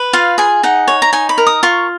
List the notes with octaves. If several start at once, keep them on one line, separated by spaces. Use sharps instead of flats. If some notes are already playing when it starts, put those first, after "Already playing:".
Already playing: B4
F4 F5
G#4 G#5
D#4 F#5
C#5
A#5
D#4 G#5
B5
A#4
D#6
F4 C#6